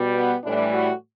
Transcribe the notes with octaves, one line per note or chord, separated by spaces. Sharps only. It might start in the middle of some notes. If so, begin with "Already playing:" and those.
Already playing: B2 G3
B3
A2 E3 G3 D4
F#4